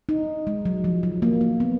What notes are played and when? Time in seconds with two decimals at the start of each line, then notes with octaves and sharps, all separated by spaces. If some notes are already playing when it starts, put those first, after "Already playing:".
0.09 D#4
0.47 G#3
0.65 F#3
0.84 F3
1.03 F#3
1.22 A#3
1.41 A#3
1.60 B3